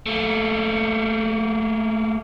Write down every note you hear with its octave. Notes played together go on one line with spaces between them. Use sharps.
A3 A#3